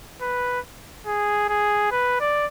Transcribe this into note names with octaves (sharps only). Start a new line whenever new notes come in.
B4
G#4
G#4
B4
D5